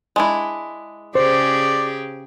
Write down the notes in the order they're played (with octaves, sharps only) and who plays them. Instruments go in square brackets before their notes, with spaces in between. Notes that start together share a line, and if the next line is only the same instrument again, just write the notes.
[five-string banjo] G#3 D4 E4
[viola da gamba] C#3 G4 G#4 [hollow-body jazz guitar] C5 [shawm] D5